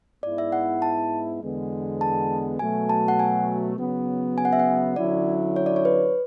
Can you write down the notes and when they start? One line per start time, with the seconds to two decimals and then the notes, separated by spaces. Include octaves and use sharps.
0.23 G#2 G#3 B3 E4 D5
0.38 E5
0.52 F#5
0.82 A5
1.42 E2 D3 G#3 B3
2.01 A5
2.59 B2 F#3 A3 G#5
2.89 A5
3.08 F#5
3.19 G#5
3.78 C#3 F#3 B3
4.38 G#5
4.45 F#5
4.53 E5
4.59 F#5
4.96 D3 F#3 C#4 E4 D5
5.56 C#5
5.66 D5
5.76 C#5
5.85 B4